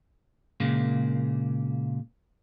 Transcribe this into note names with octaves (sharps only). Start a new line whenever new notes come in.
A#2 C#3 G#3 A#3